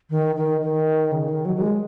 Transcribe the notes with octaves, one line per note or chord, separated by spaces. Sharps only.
D#3
D#3
D#3
C#3
D#3
F#3
F#3
G#3